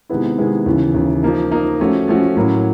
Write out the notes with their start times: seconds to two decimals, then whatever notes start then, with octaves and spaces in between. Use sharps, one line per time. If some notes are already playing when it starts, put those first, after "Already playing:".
0.10 C3 D#3 G#3 B3 E4
0.38 C3 D#3 G#3 B3 E4
0.66 D#2 C#3 E3
0.94 D#2 C#3 E3
1.23 F3 A#3 D#4
1.52 F3 A#3 D#4
1.80 F3 A3 C#4 F#4
2.08 F3 A3 C#4 F#4
2.37 A2 F#3 A#3 C#4